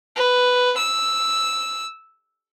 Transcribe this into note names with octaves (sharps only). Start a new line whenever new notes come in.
B4
E6